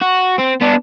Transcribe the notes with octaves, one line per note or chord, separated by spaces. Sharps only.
F#4
C4
B3 D4